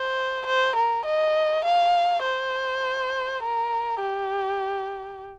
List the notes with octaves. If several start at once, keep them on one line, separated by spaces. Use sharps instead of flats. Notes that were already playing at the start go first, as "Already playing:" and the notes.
Already playing: C5
C5
A#4
D#5
F5
C5
A#4
G4